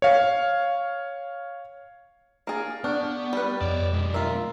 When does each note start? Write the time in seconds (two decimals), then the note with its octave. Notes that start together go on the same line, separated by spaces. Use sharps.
0.02 C#5 F5
2.47 A#3 G#4 F6 A6
2.84 B3 D4 C#6 F6 G6
3.33 G3 B4
3.61 F2 C#5 D5 E7
3.92 B1 G#3
4.14 F4 A#4 E5 A#5